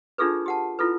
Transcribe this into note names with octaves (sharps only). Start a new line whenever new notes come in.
D4 D#4 F4 G#4 A4 B4
G4 F#5 A5
E4 F4 A4 B4